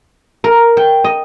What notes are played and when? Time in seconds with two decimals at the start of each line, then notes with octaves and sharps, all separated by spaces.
0.44 A#4
0.77 G5
1.04 D#5